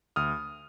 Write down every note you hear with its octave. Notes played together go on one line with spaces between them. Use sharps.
D2 D#6 F6